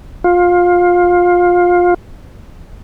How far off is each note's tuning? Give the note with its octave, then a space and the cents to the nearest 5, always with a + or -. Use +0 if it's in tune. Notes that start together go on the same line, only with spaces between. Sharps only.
F4 +20